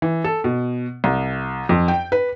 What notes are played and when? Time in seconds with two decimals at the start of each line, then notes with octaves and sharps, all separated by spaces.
0.02 E3
0.24 A4
0.44 B2
1.04 C2
1.69 F2
1.88 G5
2.12 B4